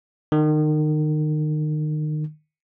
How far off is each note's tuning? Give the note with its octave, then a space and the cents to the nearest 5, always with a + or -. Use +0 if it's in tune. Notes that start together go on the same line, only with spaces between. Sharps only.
D#3 -30